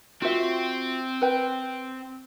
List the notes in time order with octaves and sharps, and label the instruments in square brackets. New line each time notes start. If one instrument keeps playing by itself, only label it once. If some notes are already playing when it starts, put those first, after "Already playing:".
[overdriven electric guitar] C4 [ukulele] F4 F#4 E5
[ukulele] B4 G5